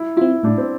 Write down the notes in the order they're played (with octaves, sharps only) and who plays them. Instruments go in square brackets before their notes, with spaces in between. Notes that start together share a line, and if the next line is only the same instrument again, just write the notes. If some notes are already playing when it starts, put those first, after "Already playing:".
Already playing: [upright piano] E4
[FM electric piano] C4 F4 [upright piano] E4
[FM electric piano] A2 [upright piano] D4
[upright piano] C4